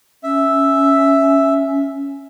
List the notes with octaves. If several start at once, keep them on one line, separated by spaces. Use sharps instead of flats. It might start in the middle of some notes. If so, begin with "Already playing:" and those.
C#4 E5